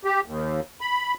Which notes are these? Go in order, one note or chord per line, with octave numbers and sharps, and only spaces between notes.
G4
D#2
B5